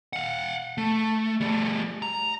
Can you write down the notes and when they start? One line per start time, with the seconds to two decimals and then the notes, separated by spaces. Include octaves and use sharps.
0.13 F5 F#5
0.78 A3
1.41 G3 A3
2.02 A#5